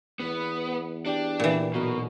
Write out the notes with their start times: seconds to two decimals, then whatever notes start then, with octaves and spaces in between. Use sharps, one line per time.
0.20 E2 B3
1.06 D4 G4 D5 G5
1.40 A#2 E3
1.74 B1 B2 B3 F#4 A#4